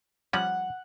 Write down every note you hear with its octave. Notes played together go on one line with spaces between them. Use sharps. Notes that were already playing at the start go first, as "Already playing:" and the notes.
F3 G3 C#4 F#5